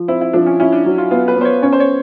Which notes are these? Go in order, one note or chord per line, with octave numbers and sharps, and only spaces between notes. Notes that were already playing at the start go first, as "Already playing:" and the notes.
Already playing: F3
C4 E4
E4
F3 D4
C#4
C#4 E4
D4
F#3
F4
B3 F4
B4
B3 C5
C#5
C#4 C#5
C5
C#5